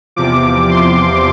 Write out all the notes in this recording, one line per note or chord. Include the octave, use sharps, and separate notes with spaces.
E2 C3 F3 D6
C6